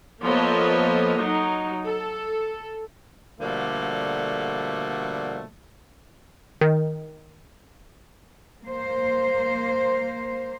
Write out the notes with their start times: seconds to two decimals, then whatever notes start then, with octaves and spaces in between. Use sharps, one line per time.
0.22 F3 A#3 B3 A4 C#5 D#5
1.19 F#3 D#4
1.85 A4
3.41 B2 D3 F3 G3 A3 A#3
6.61 D#3
8.64 A#3 C5